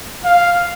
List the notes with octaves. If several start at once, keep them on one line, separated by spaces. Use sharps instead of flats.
F5